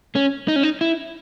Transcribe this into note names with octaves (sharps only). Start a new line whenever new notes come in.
C#4
D#4
C#4
D#4
E4